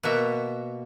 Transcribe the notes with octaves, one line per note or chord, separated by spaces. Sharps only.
B2 A#3 F#4 E5